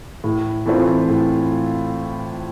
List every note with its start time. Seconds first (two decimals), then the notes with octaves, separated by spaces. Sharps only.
0.24 A2
0.66 E3 A3 C4 F4
1.08 A2